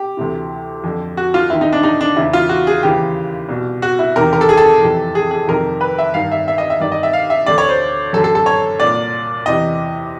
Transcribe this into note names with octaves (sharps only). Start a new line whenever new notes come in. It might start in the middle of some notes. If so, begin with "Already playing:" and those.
Already playing: G4
D2 C3 E3
F2 D3
F#4
F4
D#2 D#3 E4
D#4
D4
D#4
D4
E2 C#3 E3 E4
F4
F#4
G#4
D#2 C#3 E3 G4
C2 B2
F#4
E4
E2 C3 D#3 A#4
A#4
A4
G#4
A4
F2 C3 E3
G#4
G#4
F2 C3 D#3 A#4
B4
E5
G2 D#3 F5
E5
E5
D#5
E5
G2 D#3 D5
D#5
E5
F5
E5
D2 D3 D5
C#5
C5
F#2 D3 A4
A4
A4
C#5
C2 A#2 D5
E2 C3 E3 D#5